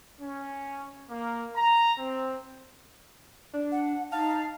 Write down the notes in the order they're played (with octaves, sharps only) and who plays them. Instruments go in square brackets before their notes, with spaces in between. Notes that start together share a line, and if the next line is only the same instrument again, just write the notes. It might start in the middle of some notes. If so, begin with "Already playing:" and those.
[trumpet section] C#4
A#3
A#5
C4
[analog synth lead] D4
[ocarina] F#5
[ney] D#4 [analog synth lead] F5 [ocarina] A5